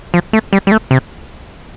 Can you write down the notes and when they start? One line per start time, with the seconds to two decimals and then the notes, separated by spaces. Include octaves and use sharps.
0.14 F3
0.33 A3
0.53 G3
0.67 G3
0.72 A3
0.91 C3